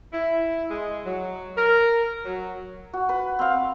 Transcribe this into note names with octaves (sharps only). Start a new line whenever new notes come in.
E4
G#3
F#3
A#4
F#3
F#4
B4
C4 F5